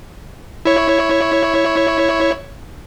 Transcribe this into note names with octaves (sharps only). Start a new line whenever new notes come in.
E4 C#5